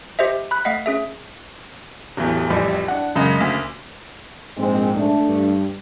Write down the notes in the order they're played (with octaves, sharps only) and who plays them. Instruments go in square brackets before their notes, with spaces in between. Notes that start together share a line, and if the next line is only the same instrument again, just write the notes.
[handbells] G4 C5 D#5 E5
B5 F#6
A3 D#5 F5 F#5 B6
C#4 G#4 E5
[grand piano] D1 E2 G4
A1 F2 G3
D4 F#5
F#2 C#3 G#3
D2 C#3 B6
[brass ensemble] A#1 G#2 [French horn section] G#3 C4
[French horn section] A3 D4
[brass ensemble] G2